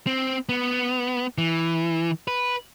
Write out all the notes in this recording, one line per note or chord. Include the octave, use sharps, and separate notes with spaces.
C4
B3
E3
B4